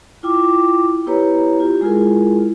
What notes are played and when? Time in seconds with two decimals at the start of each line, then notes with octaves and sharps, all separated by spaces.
0.23 E4 F4 G5 D6
1.06 B3 E4 G4 B4 C#5 A#5
1.60 F4 G4
1.81 G#3 E4 F4 G#4 A#4